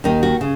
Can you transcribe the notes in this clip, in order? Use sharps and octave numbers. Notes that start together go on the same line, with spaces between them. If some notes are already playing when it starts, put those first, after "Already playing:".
D#2 D#3 D#4
F#4
C#3